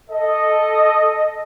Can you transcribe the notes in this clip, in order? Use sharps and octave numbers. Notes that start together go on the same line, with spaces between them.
A4 D#5